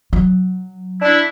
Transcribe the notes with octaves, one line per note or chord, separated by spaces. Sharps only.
F#3
D4 E4